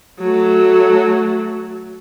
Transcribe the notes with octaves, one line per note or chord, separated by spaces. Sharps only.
F#3 A3